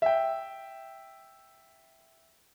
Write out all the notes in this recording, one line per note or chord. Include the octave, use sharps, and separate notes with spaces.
E5 G5